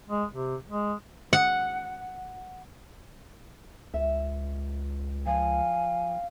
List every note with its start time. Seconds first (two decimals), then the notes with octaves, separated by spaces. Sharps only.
0.10 G#3
0.33 C3
0.70 G#3
1.33 F#5
3.94 C#2 E5
5.26 F3 F5 G#5